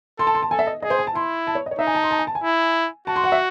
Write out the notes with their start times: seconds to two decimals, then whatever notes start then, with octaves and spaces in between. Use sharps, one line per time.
0.19 A4 C6
0.27 A5
0.35 C6
0.43 A5
0.51 A4 G#5
0.59 E5
0.67 D#5
0.82 G#4 D#5
0.90 C5
0.99 G#5
1.07 A5
1.15 E4 C6
1.47 A5
1.55 C#5
1.66 D#5
1.71 C#5
1.79 D#4 E5
1.87 G#5
1.95 A5
2.04 C6
2.11 A5
2.19 G#5
2.27 A5
2.35 G#5
2.44 E4
3.07 F#4 A5
3.16 C6
3.24 F#5
3.32 E5